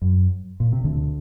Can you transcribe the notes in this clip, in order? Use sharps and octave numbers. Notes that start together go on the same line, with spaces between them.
F#2
A#2
C3
D2 D3